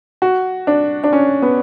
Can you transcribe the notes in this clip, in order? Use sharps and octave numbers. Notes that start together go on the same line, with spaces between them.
F#4
D4
D4
C#4
B3